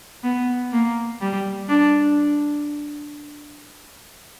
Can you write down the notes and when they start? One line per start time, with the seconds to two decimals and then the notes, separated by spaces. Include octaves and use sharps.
0.24 B3
0.73 A#3
1.21 G3
1.69 D4